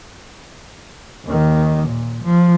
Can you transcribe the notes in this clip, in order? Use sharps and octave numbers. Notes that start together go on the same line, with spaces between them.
D#2 D#3
A#2
F3